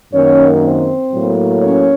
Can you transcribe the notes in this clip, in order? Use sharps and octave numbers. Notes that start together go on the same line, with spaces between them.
F#2 D#3 A#3 C#4 C#5
C4 C5
A2 F#3 A#3
C#4 C#5